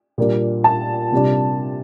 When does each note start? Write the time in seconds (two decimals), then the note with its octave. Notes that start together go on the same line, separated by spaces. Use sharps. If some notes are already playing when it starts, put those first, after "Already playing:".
0.18 A#2 G3 A#3 D4
0.64 A5
1.12 C3 G3 D4